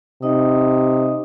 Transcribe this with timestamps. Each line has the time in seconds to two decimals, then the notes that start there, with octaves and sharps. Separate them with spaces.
0.22 C3 D#4 D#5 D#6